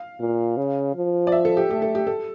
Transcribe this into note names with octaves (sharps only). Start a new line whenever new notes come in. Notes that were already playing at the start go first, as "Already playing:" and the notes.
Already playing: F5
A#2
C#3
F3
D5
E5
A4
G4
A3 G4
A4
G4
A4